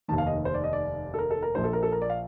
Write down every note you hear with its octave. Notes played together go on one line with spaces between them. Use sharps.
F1 D#2 D#3 A5
F5
D#5
C5
D5
D#5
D5
A4
A#4
A4
A#4
A#1 A#2 F3 C5
A4
A#4
A4
A#4
D5
F5